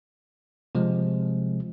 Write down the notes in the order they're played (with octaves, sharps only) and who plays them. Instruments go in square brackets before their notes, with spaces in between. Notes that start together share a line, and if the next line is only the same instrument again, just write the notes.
[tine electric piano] C3 F3 G#3